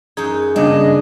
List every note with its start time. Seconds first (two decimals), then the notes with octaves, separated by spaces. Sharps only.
0.17 F#2 D#4 G#4
0.56 G2 C#3 D4 D#5